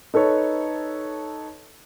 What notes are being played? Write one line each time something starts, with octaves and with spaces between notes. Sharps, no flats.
D#4 A4 B4 C#5